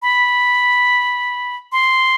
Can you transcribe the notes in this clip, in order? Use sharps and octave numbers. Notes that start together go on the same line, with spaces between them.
B5
C6